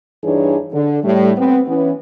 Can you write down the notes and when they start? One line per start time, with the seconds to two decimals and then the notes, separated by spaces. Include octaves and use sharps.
0.23 G2 E3 D4 D#4 G#4 C#5
0.72 D3
1.04 A2 G3
1.37 B3 C4
1.68 E3 B3 C#4